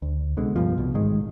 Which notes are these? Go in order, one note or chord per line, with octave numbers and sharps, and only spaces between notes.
D2
C2 B2 D3 G#3
C#2 G2 B2 F3
C2 B2
A1 G#2 D#3 G#3